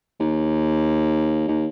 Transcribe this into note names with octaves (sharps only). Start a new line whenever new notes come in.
D#2
D#2